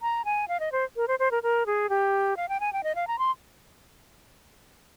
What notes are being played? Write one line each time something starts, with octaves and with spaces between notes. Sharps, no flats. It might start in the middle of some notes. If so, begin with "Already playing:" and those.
A#5
G#5
F5
D#5
C5
A#4
C5
C5
A#4
A#4
G#4
G4
F5
G5
G#5
G5
D#5
F5
A#5
C6